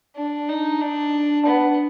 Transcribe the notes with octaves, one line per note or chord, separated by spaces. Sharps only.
D4
D#4
D4
B3